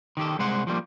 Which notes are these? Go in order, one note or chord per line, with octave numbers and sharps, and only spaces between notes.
D#3 G4 A4
C2 G#3 C5 F#5
F3 G3 G#3 A#3